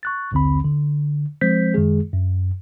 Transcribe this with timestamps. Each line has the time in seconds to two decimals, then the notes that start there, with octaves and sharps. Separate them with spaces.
0.03 C#6 F#6 A6
0.32 A#1 D#2 D3 C4 B5
0.65 D3
1.41 F3 G#3 C4 C5 G6 B6
1.74 F#2 D#3 G#3 G#4
2.13 F#2